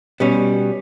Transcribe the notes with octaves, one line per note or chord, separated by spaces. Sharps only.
B2 G3 C#4